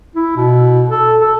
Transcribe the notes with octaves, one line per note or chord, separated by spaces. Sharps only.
E4
B2
A4
A4